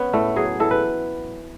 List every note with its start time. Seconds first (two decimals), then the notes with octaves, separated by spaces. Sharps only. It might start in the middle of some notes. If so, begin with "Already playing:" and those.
Already playing: B3 C#4
0.13 A2 A3
0.36 F#3 G#4
0.60 E3 A4
0.71 B4